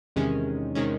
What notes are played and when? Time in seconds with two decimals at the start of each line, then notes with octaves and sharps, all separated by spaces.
0.16 E2 C3 D#3 G#3 C#4
0.75 C3 D#3 G#3 C#4